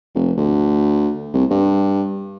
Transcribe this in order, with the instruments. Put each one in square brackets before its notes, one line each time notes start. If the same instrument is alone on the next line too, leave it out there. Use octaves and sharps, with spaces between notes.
[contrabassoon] F1
D2
C2
G2